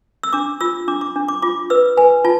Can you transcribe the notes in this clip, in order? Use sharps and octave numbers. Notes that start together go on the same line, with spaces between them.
E6
D4 D6
F4 E6
D4 D6
D6
D4
D6
F4 D6
B4 E6
B4 G#5
F4 A5